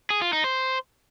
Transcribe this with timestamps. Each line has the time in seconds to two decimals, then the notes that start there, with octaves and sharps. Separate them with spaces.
0.10 G#4
0.22 F4
0.33 D#4
0.44 C5